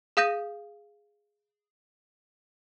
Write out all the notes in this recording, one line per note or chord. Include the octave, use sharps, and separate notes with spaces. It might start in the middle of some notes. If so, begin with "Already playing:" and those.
G#4 F5 D#6 G6 A#6 D#7